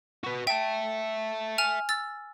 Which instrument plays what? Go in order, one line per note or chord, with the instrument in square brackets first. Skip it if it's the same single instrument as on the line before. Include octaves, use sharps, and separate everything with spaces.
[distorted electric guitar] F#4 B4
[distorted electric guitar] E5 A5 [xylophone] G5
[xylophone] G#5 F6 F7
E6 A6